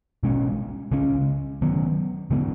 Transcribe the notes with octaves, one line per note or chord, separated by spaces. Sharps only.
B2 G#3 C#4
C#3 G#3 C#4
D#3 F#3 B3
C#3 G#3 B3